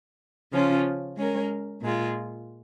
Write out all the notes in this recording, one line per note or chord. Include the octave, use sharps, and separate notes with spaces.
C#3 F3 C#4 F4
G#3 C#4 A#4
A#2 G#3 F4